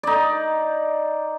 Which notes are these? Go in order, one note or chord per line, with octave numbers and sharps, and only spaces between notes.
D#4 D5